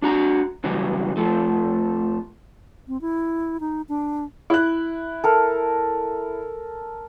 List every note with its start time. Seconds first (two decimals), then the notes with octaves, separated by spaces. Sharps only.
0.02 D4 F#4 A#5
0.64 C#3 E3 F#3 G3
1.17 F2 F3 A3
2.87 C4
3.01 E4
3.60 D#4
3.89 D4
4.50 E4 F#6
5.24 A4 A#4